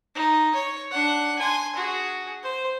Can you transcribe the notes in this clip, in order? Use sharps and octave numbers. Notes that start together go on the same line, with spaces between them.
D#4
C#5
D4 F#5
G#5 C6
F#4 G#4
C5